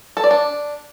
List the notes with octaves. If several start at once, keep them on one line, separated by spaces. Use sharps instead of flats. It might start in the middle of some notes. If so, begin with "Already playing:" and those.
A4
D5
D4